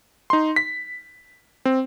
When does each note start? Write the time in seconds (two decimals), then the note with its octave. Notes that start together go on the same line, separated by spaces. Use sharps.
0.30 D#4 C6
0.56 B6
1.65 C4